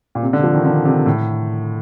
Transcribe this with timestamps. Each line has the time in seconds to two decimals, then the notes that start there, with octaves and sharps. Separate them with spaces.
0.15 A#2
0.22 C3
0.33 D3
0.44 F3
0.54 D#3
0.65 D3
0.85 C3
1.06 A2